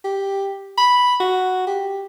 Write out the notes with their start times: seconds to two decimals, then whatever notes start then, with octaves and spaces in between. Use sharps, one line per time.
0.05 G4
0.78 B5
1.20 F#4
1.67 G4